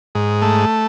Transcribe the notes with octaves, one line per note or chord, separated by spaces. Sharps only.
G#2
A3